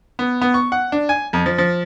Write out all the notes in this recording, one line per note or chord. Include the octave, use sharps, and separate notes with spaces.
B3
B3
C#6
F#5
D4
G#5
F2
F3
F3